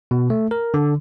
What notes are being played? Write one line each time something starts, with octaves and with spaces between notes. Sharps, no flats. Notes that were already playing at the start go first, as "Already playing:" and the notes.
B2
A3
A#4
D3